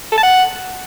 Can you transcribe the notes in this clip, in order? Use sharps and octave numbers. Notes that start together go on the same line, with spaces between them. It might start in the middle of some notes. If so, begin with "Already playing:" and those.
A4
A5
F#5